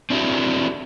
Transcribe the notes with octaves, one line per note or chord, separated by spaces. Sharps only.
C4 D4 E4 F#4 G4